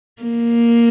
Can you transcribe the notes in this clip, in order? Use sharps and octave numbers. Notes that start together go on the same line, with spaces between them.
A#3